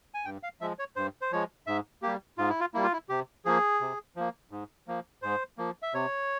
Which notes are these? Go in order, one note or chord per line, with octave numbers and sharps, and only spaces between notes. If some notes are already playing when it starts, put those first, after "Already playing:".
G#5
G2 G5
F5
F3 G#3 E5
C#5
G2 C5
C5
F3 G#3 C#5
G#2 E5
G3 A#3 G4
G#2 F4
E4
F4
G3 A#3 E4
F4
E4
C3 G4
F3 A#3 G#4
C3
F3 A#3
G#2
F3 A#3
G#2 C5
F3 A#3
E5
C3 C#5